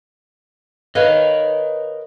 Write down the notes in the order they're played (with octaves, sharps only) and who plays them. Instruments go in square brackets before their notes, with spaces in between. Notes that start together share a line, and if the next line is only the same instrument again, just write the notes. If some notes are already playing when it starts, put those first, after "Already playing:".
[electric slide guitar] A#4 D#5 [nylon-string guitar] B4 C#5 F5